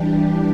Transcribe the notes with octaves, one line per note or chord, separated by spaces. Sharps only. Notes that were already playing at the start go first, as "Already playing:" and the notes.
Already playing: E3 G3 D4 G4